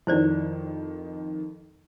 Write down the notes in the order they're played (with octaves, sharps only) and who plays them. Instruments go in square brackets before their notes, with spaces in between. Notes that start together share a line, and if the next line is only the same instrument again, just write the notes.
[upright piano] F2 D#3 [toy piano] E4 C5 D5